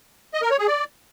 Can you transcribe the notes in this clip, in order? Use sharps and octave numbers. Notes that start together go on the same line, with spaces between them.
D#5
A#4
C#5
G#4
D5